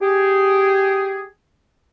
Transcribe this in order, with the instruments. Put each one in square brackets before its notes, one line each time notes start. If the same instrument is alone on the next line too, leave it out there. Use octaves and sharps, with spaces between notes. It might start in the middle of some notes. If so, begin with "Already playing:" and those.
[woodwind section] G4 G#4